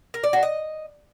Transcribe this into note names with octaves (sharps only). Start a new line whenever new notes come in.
A#4
D5
F#4
D#5